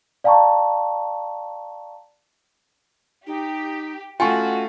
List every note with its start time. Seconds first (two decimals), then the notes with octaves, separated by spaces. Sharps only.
0.24 D5 F5 G5 A5 A#5 C#6
3.27 D#4 G4
4.20 A3 C#4 F4 F#4 G5 G#5 C#6